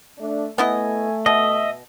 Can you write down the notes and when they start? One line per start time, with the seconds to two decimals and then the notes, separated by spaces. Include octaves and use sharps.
0.19 A3 D4
0.58 A3 B3 E4 D#5 G#5
1.26 B2 D#5 E5